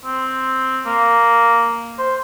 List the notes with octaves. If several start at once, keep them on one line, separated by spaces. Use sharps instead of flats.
C4
A#3
C5